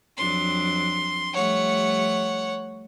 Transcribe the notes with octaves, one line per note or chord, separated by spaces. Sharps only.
F2 F#3 D4 C6
F3 G3 A3 C#5 F#5